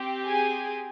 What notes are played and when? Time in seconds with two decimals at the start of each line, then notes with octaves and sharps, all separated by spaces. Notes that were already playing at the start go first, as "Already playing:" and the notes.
Already playing: C4 G4
0.25 G#4 G#5